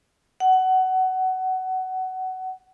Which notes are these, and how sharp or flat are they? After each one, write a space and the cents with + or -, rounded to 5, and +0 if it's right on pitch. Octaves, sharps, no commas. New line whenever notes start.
F#5 +20